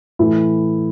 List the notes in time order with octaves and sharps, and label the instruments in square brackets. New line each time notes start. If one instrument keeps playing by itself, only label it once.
[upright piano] A2 E3 E4